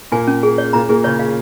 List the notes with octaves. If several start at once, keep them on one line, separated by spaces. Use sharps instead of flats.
A#2 A#3 G#5
C#4
G#4
C#5
A#2 A#3 A#5
A#2 A#3 G#4
C#3 C#4 C#5
F5